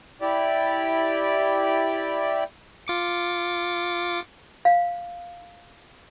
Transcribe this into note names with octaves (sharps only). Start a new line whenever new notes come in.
E4 G4 D5
F4 D6 C#7
F5